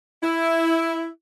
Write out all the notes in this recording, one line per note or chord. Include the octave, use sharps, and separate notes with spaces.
E4